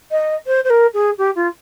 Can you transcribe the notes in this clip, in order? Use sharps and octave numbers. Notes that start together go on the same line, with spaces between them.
D#5
C5
C5
A#4
G#4
G4
F4